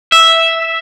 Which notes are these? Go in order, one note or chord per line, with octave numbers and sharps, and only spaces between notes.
E5